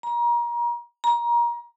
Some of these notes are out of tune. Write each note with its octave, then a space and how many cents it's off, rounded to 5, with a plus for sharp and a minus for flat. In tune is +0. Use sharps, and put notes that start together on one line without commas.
A#5 +30
A#5 +25